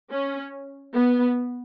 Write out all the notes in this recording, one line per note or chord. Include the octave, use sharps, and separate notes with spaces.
C#4
B3